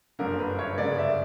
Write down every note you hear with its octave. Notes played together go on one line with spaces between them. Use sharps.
G1 F#2 D3 A#3 A#4
B4
C#5
G1 F#2 C#3 D5
E5